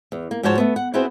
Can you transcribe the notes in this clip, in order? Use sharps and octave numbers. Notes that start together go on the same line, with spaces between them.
E2
A#3
G#2 F3 F#4 C5 C#5 A5
A3 B3
F#5
B3 C4 E4 F#4 G#4 C5